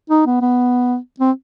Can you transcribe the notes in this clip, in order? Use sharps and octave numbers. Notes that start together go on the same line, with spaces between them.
D#4
B3
B3
C4